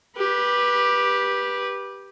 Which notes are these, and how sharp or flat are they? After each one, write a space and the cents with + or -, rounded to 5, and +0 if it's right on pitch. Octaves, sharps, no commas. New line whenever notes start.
G4 +5 B4 -20